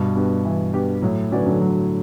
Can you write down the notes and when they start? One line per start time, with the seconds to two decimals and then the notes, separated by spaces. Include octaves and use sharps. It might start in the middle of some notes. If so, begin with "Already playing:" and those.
Already playing: G2 B2
0.15 B3 D4 G4
0.45 E3
0.73 B3 D4 G4
1.02 A2 F#3
1.31 D3 F#3 C#4 F#4 B4 D5
1.46 D3 F#3
1.61 F#3